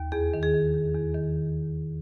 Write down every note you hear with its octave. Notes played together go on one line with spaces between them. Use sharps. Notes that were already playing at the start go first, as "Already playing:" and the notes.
Already playing: D#2
E2 G#4
D#3
G#4
D#3
E2
E2
D#3